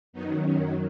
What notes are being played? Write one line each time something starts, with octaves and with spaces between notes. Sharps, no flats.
F#2 D#3 F#3 B3 D#4
F#2 D#3 F#3 C#4